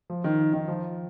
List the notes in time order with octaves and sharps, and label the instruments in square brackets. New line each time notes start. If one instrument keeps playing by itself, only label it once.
[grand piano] F3
D#3
D#3
F3